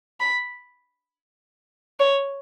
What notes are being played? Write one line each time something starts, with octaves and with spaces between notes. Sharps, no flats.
B5
C#5